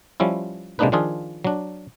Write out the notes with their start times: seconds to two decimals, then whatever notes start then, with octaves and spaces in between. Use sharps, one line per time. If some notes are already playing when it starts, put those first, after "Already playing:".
0.20 F3 G3 C#4 E4
0.79 C3 G#3 A#3 D4 D#4 B4
0.92 D#3 F3 D4 F4 G#4
1.45 F#3 D4